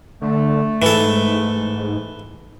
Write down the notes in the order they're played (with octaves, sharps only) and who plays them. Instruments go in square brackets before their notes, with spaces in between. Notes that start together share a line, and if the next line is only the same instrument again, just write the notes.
[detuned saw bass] D3 [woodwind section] A3
[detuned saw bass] G#2 [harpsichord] E3 A4